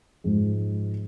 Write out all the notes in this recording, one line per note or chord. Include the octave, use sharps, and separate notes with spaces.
G#2 F3 G#3